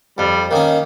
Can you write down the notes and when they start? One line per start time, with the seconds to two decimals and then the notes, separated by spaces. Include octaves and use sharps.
0.18 F2 G3
0.51 D#3 A#3 C#4